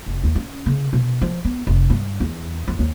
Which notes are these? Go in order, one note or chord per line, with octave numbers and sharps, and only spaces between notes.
F1
D#2
C#4
C#3
B2
F3
B3
F1
G2
E2
F2
D#2